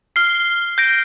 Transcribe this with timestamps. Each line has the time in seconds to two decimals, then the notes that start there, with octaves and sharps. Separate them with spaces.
0.16 F6 C7 G7
0.78 G6 A#6 D7